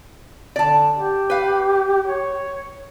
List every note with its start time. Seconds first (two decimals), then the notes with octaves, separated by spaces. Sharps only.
0.56 D3 D5 A5
0.95 G4
1.30 B4 F5
2.07 C#5